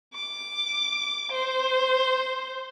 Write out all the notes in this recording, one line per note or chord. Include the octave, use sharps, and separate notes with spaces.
D6
C5